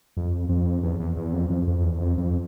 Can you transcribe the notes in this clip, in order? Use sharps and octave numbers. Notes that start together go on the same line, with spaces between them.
F2
F2
E2
E2
E2
F2
F2
F2
E2
F2
F2